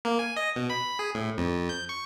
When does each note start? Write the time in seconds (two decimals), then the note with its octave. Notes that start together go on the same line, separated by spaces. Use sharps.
0.05 A#3
0.19 G#5
0.36 D#5
0.56 B2
0.70 B5
0.99 G#4
1.15 A2
1.38 F2
1.69 G6
1.89 C#6